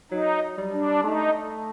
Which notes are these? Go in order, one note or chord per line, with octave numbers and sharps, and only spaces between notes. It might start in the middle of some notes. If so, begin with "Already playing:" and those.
F#3 D#4
G3
D4
A3 D#4